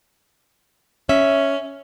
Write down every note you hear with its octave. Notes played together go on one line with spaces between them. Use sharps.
C#4 E5